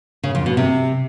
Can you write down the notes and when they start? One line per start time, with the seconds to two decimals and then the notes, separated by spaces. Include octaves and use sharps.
0.23 C#3
0.35 F2
0.46 B2
0.57 C3